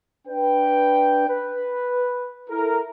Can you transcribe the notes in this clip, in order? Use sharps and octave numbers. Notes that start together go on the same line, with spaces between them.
D4 B4 G5
B4
E4 A4 A#4